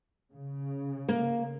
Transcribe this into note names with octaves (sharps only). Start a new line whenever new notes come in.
C#3
A#3